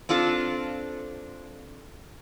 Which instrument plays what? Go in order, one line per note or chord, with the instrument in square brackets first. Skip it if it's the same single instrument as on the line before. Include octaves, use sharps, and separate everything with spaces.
[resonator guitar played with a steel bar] C4 D4 F4 A4